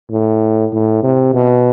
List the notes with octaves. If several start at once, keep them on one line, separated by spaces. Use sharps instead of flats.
A2
A2
C3
B2